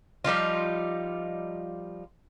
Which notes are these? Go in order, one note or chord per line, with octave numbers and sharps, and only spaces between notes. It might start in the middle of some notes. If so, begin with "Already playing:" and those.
F3 G3 D#4 F4